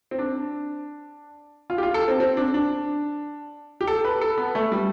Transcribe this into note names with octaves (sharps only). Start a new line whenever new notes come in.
C4
D4
F4
G4
F4
A4
C4
C4
D4
D4
G4
A4
B4
A4
B3
A3
G3